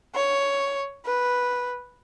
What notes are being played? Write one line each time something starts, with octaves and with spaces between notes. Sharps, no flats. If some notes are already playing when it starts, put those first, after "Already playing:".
C#5
B4